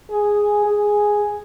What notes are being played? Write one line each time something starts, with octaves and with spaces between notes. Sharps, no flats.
G#4
G#4